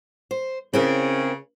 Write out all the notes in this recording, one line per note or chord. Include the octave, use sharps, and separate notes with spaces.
C5
C#3 C4 E4 A#4